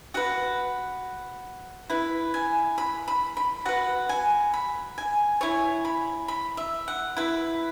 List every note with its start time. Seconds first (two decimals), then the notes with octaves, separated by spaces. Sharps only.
0.14 F#4 B4 F#5
1.90 E4 B4
2.34 G#5
2.78 B5
3.08 B5
3.37 B5
3.65 F#4 B4 F#5
4.09 G#5
4.54 B5
4.98 G#5
5.41 E4 C#5 G#5
5.85 B5
6.28 B5
6.57 E5
6.88 F#5
7.17 E4 B4